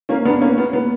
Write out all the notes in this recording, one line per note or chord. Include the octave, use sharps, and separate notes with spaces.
A#3 C#4
B3 D4
A#3 C#4
B3
B3